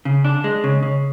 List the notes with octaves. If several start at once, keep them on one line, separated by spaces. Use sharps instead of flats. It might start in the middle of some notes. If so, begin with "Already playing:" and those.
C#3
D4
G#3
C#3
C#3